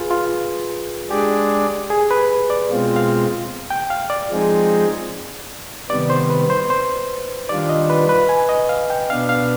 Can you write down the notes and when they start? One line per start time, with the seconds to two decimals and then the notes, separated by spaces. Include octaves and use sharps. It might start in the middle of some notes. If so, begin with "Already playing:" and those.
Already playing: F4 G#4 B4
0.11 F4
1.10 G#3 D4 G4 G#4 D5
1.90 G#4
2.11 B4
2.50 D5
2.70 B2 G#3 C4 F4
2.96 F5
3.70 G5
3.90 F5
4.10 D5
4.30 F3 G#3 C4 D#4 G#4
5.90 C3 D#3 G3 B3 D5
6.10 C5
6.30 B4
6.50 C5
6.70 C5
7.49 D#3 G3 D4 F4 D5
7.69 D#5
7.90 B4
8.09 B4
8.29 G#5
8.49 D#5
8.69 F5
8.90 G5
9.09 B2 B3 D4 F5
9.29 F5